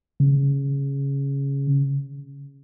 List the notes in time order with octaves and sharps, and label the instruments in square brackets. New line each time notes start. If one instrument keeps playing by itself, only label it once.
[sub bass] C#3